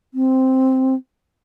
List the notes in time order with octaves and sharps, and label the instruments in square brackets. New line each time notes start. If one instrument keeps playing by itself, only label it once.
[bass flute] C4